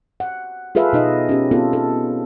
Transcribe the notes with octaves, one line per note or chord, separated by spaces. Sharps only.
F#5
F4 G#4 A4 B4 E5 F5
B2 D#4 D#5
C#4 G4
B3 C4 F4 A4
A4